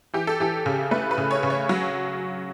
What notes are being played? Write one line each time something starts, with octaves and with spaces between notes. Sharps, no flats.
E3 G4
A4
E3 G4
C#3
A3 B4
B4
C#3
C#5
C#3
C#5
F#3